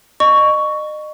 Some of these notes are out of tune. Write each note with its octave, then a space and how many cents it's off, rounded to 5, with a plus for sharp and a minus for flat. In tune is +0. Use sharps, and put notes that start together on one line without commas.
D#5 -35 C#6 +10